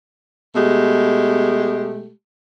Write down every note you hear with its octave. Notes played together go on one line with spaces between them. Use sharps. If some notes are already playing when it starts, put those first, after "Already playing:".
B2 G#3 A3 G4